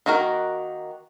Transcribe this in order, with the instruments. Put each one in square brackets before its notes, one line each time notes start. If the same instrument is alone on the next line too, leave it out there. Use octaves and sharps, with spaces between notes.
[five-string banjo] D#3 A#3 D#4 F#4 A#4